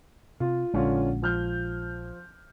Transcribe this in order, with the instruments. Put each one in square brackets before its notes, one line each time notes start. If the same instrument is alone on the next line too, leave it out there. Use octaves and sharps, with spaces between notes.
[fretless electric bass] C3 [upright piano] F4
[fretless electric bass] A#1 G#3 [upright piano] D3 C#4 F4
[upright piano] F3 F6 G6